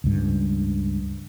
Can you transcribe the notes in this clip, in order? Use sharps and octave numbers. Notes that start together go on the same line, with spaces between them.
C#2 G2